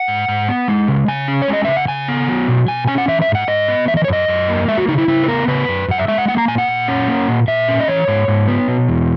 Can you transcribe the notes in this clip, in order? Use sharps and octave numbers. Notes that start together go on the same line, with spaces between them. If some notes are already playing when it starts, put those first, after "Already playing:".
Already playing: F#5
G#2
G#2
B3
G#3
C#3
C#3 G#5
C#4
C#5
G#3
D#5
C#3 E5
F#5
C#3 G#5
B3
F#3
B2
B2 G#5
C#4 G#5
F#5
E3 E5
E5
G#2
F#5
G#2 D#5
B3
E3 E5
D#5
C#5
F#2 D#5
F#2
A#3
G#3 E5
F#4
C#3 D#4
E4
C#3 E4
B4
B3 A#4
C#3 B4
F#2
F#2 F#5
E5
G#3 E5
F#5
A#3 F#5
A#5
A#2 G#5
F#5
A#2
C#4
A#3
A#2
A#2 E5
C#4
D#5
E3 C#5
G#2
G#2
B3
B2
E2